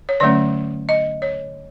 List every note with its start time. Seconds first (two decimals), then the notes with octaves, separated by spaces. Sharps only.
0.09 C#5
0.20 D3 F#3 A3 C#4 D5
0.89 D#5
1.22 C#5